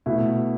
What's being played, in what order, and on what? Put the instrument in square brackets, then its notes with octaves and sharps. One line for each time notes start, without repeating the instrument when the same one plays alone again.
[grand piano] B2 A3 E4